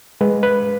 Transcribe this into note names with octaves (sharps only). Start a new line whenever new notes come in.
G#3 B4
B4